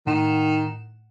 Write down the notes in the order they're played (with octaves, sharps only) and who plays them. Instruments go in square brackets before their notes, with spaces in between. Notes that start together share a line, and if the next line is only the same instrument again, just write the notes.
[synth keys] A2 F#5 E7 [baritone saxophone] D#3